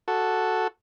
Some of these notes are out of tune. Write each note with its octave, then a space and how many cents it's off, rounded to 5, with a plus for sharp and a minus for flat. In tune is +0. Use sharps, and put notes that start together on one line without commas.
F#4 +0 A4 +0